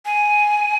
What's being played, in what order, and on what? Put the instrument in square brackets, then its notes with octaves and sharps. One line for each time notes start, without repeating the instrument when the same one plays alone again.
[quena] G#5